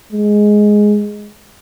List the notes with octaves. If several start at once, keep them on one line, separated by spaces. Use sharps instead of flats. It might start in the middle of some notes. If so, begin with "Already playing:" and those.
G#3